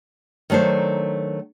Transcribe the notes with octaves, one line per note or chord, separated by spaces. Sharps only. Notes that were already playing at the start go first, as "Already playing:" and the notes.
D#3 F#3 A3 D4 C5